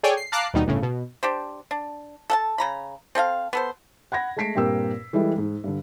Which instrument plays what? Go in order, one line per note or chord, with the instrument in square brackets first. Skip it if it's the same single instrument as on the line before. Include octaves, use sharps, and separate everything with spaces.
[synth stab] G#4 A4 C#5 D5 G5 G#5
C7
F5 A5 A#5 D6 F#6 C7
D#2 B2 G3 D#4
G1 A2 C#3
B2
[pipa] D4 G4 C5
D4
A4 F#5 A5
C#3 A#5 B5
C4 A4 E5 F5
B3 A4 C5
[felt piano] F#5 B5 G#6 A#6
G#3 A3 A5 B6 C7 D7
G2 A#2 C4 G4 A#4 E6
E3 G3 G#3 E4 A4
G#2
G2 D3